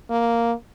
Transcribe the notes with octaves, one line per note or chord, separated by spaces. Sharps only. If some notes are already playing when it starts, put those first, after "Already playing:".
A#3